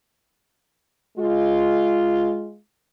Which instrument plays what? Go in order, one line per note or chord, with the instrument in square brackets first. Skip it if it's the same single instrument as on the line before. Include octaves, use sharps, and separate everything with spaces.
[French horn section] G#3 F4